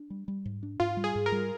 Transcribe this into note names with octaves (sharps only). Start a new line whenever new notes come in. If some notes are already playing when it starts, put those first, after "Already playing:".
Already playing: D4
G3
G3
G#2
D4
G#2 F4
G3
G#4
G#2
A#4
G3